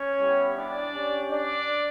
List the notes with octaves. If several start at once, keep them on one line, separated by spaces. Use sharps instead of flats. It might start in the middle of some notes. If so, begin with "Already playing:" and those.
Already playing: C#4 C#5
G3 B3 E4 G4
D4 D5
C#4 G4
D4 D5